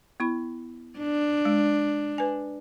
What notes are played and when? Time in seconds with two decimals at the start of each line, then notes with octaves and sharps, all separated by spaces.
0.20 B3 E4 B5
0.99 D4
1.45 G#3
2.18 B4 G#5